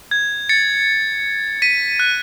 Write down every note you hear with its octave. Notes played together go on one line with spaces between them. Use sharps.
G#6
A6 C#7
B6 D#7
F#6